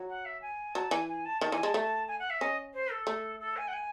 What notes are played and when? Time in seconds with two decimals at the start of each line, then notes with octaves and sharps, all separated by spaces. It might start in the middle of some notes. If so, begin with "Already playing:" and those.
Already playing: F#3
0.08 F#5
0.25 E5
0.42 G#5
0.74 F#3 A5
0.91 E3 G#5
1.08 G#5
1.25 A5
1.41 D#3 A5
1.52 E3 G#5
1.63 G#3 A5
1.74 A3
2.08 G#5
2.19 F#5
2.30 E5
2.41 C#4 D#5
2.74 C5
2.91 A4
3.07 A3
3.40 A4
3.57 G#5
3.68 F#5
3.73 G#5